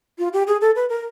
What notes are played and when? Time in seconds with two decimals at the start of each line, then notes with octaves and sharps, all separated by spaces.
0.18 F4
0.33 G4
0.47 G#4
0.61 A4
0.76 B4
0.89 A#4